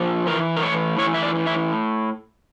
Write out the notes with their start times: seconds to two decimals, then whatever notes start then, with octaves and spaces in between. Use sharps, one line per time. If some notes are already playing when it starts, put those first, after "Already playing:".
Already playing: A#2 F3
0.27 E3 A#4
0.56 A#4
0.62 A2 C#5
0.98 E3 C#5
1.14 E5
1.23 D5
1.35 A2
1.46 E5